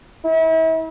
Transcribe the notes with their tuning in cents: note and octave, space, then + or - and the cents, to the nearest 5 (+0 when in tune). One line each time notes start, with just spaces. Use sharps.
E4 -40